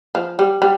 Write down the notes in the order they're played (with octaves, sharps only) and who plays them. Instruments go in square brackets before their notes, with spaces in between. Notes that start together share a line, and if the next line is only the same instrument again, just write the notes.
[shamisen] F3
G3
G3